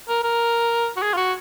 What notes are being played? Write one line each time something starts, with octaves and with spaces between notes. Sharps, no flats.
A#4
A#4
F#4
G#4
F4
F#4